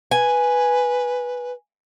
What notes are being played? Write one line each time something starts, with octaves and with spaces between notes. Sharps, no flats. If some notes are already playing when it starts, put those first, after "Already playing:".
B4 G#5